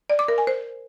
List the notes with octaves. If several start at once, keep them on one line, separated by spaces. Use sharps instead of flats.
D5
D6
A#4
G#5
C5